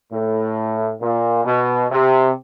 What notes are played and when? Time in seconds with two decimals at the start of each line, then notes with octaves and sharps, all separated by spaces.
0.12 A2
1.01 A#2
1.45 B2
1.91 C3